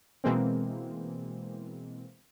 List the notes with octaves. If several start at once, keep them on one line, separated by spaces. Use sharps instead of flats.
B2 E3 G#3 A#3 C4